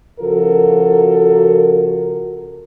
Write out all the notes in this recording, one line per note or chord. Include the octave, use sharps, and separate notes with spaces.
C#3 F3 F#4 A4 A#4